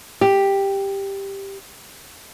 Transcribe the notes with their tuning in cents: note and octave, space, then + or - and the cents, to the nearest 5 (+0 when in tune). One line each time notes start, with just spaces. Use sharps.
G4 +5